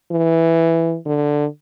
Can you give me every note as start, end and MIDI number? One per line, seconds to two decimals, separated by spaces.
0.11 0.97 52
1.06 1.46 50